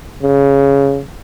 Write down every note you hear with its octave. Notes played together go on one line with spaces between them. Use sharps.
C#3